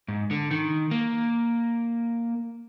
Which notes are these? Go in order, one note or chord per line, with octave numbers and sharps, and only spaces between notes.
G#2
D3
D#3
A#3